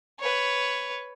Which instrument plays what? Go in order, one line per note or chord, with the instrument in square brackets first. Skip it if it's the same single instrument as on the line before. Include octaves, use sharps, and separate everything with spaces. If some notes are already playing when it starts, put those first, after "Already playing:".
[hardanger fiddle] B4 C#5